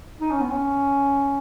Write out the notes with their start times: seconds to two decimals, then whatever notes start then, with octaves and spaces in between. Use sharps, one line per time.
0.21 D#4
0.31 C#4
0.41 B3
0.51 C#4